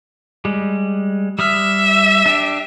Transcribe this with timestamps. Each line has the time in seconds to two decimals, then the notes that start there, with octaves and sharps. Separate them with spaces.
0.45 G3 G#3
1.39 G3 E5 D#6 F6
2.26 D4 G4